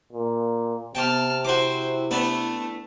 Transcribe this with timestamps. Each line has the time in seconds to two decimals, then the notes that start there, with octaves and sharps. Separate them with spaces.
0.13 A#2
0.95 C3 B3 G5 A5 F6
1.45 E4 F#4 C5 D6
2.11 A3 B3 D4